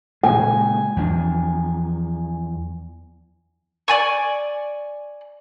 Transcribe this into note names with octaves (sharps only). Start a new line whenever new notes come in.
A#2 C#3 G#3 G#5
E2 F3 D4
D5 G#5 C#6